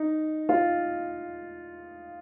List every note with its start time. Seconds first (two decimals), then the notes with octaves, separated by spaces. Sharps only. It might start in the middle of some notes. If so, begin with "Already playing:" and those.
Already playing: D#4
0.49 F4